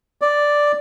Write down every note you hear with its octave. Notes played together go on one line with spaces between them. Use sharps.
D5